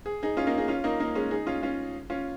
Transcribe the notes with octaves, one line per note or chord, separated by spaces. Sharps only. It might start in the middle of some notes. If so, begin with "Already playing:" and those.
G#4
D#4 G#4
C#4 F4
A#3 D#4
D#4 G#4
C#4 F4
A#3 D#4
A#3 D#4
G#3 C#4
D#4 G#4
C#4 F4
C#4 F4
C#4 F4